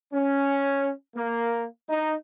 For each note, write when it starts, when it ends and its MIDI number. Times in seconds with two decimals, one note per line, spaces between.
0.12 0.91 61
1.15 1.65 58
1.88 2.14 63